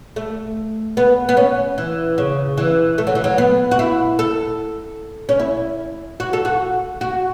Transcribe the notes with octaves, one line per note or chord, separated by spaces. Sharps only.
A3
B3
B3
C#4
E3
C#3
E3
A3
F#3
E3
F#3
B3
F#4
E4
A4
C#4
E4
F#4
A4
F#4
F#4